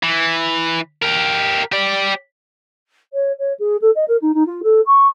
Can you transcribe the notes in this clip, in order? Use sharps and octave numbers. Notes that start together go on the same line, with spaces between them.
E3
G4 A#4
G4 D5
C#5
C#5
G#4
A4
D#5
A#4
D#4
D#4
F4
A4
C#6